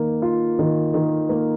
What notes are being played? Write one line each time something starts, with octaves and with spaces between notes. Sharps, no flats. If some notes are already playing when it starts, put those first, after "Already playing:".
Already playing: D#3 A#3
F4
D#3
D#3
A#3